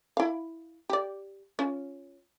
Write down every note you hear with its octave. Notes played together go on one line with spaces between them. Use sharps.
E4 F5
G4 D5
C#4 F4